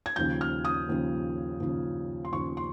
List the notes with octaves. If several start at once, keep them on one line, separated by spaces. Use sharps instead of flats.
G#6
D#2 C#3 F3 G6
F6
D#6
D#2 C#3 F3
D#2 C#3 F3
C6
D#2 C#3 F3 C#6
C6